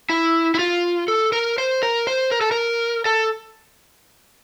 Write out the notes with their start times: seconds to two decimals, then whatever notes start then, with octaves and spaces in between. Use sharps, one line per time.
0.10 E4
0.55 E4
0.59 F4
1.08 A4
1.32 A#4
1.58 C5
1.83 A#4
2.07 C5
2.32 A#4
2.41 A4
2.51 A#4
3.06 A4